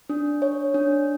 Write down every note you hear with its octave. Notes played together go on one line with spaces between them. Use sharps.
D4
C#5
D4